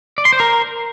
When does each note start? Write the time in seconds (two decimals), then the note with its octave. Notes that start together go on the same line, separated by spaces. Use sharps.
0.18 D5
0.25 C6
0.33 C5
0.40 A#4